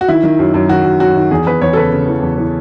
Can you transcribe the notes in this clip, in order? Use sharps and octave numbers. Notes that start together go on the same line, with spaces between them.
F#4
D#3 E4
D#3
F#2
F#2
D#3 F#4
F#2
F#2 F#4
D#3
E2 G#4
E2 B4
E2 C#5
A4
C#3 B4
C#3
E3
E2
E3